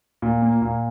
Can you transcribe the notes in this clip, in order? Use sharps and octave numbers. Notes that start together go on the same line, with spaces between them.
A#2
A#3
A#2